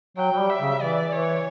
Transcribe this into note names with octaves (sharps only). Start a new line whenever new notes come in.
F#3 G5
F#3
G3
E5
C#3
E3 D5
E3 C#5